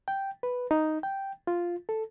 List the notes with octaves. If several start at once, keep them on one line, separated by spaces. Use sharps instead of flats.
G5
B4
D#4
G5
F4
A4